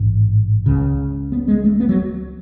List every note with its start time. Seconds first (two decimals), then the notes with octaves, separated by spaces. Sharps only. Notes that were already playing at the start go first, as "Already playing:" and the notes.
Already playing: A1 G#2
0.66 C#2 C#3
1.32 B3
1.48 G#3
1.64 A3
1.80 B3
1.89 F#3